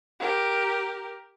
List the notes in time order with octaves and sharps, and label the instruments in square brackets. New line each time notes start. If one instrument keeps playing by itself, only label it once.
[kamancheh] G4 A#4